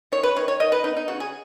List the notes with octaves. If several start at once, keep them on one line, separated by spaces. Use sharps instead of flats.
D#3 C#5
B4
D#3 C#5
C#5
D#3 D#5
B4
B3 D#4
D#4
C#3 F#4
G#4